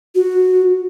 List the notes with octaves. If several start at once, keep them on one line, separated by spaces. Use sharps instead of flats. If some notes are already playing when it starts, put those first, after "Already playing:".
F#4